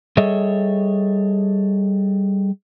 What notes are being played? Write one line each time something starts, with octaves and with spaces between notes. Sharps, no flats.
G3 G#4 A4 C#5 D#5 E5